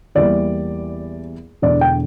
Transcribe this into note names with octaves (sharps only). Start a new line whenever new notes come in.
E2 E3 G3 A#3 D5
E1 E2 D3 D5
G5